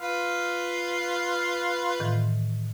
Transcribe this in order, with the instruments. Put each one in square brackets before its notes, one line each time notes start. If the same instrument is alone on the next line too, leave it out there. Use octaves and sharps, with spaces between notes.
[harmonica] F4 B4 F5
[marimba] A2 D#3 E3